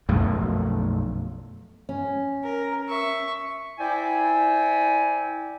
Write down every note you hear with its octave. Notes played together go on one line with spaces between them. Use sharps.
B1 F#2 F3 A3
C#4
A#4
E5 C#6
E4 C5 D5 G5 G#5